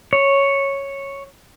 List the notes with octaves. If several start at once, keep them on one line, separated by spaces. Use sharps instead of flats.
C#5